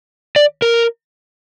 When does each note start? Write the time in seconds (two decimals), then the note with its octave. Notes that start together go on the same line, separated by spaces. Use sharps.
0.36 D5
0.62 A#4